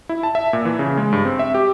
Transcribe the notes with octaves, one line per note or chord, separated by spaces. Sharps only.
E4
A5
E5
A#2
E3
C#3
G#3
G2
C4
E5
G4